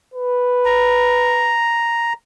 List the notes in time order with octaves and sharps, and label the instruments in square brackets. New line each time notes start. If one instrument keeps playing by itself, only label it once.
[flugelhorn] B4
[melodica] A#5